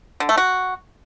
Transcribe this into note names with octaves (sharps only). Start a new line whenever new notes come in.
D3
A3
F#4